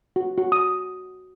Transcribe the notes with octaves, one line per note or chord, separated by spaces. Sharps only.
F#4
F#4
D#6